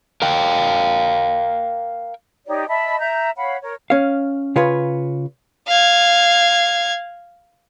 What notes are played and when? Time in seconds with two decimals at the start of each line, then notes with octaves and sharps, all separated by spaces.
0.22 A#4 F5 G5
2.46 D#4 G4 C#5 D5
2.68 D#5 E5 A5 B5
3.00 E5 A#5 G6
3.37 C#5 F5 F#5 B5
3.62 A#4 C#5
3.90 C#4 F5
4.56 C#3 F4 B4 C#5
5.68 F5 G#6